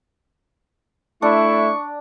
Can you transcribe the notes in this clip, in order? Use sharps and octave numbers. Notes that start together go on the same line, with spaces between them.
A3 D4 E4 C#6